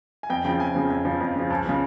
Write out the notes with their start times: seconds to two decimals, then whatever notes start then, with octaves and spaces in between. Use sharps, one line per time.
0.23 G#5
0.30 F2 G5
0.45 C#3 F3 G5
0.60 F2 G#5
0.75 C#3 F3
0.90 F2 G#5
1.05 C#3 F3
1.20 F2
1.36 C#3 F3
1.50 C#2 A5
1.66 C#3 F3